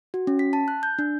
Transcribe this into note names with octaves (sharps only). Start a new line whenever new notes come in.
F#4
C#4
B6
A5
F#6
G6
D4